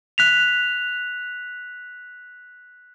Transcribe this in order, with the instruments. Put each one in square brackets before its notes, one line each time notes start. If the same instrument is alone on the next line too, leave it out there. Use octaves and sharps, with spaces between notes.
[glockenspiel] F#6 B6 F7